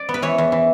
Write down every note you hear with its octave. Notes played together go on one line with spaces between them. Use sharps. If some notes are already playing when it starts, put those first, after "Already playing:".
Already playing: D5
B3
B4
E3 C#5
E2
E3